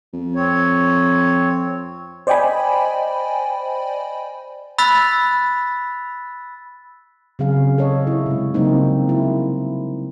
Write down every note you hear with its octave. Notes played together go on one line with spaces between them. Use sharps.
F2
C4 C#5
C5 D5 D#5 G5 G#5 B5
B5 E6 F#6 A6 B6
C#3 F#3 C4 G#4 F5
A4 C#5 D#5
E4
C3 G#3
C#3 F#3 G3 A#3 C4 D#4
E4